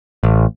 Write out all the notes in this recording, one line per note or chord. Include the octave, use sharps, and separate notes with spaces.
A1